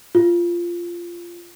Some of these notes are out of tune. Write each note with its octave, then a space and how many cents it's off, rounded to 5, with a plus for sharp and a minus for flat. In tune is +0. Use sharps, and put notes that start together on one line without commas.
F4 -15